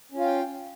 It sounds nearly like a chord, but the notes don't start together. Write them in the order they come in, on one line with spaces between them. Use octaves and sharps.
C#4 F4 F5 G5